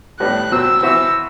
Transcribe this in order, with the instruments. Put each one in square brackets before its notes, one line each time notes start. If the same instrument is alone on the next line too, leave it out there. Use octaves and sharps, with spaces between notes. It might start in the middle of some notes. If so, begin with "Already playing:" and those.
[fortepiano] A2 G3 B3 D4 [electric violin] F#6
[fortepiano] B2 F#3 C4 [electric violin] E6
[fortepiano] E3 B3 F#4 C5 E5 [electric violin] E6